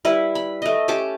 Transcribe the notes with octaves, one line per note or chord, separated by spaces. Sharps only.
G3 E4 B4
B5
A3 D#5
C#4 G4 A5 D6